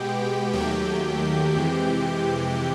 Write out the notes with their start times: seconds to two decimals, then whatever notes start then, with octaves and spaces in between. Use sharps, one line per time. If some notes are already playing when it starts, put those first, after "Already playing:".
Already playing: B2 G#3 B3 G4 G5
0.53 D#2 D#3 F#3 A3 G4 G5
1.56 F2 C3 E3 G#3